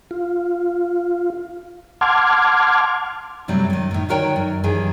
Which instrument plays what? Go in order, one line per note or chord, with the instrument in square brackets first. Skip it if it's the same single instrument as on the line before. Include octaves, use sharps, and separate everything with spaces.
[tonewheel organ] F4
F#5 A5 C6 D6 F6 G#6
[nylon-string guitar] F#2 C3 F#3 G3 A3
F#2 D#3
A2 D#3
D3 D#3 F#4 A#4 C#5 G5
F#2
F#2 D#3 E3 G4 G#4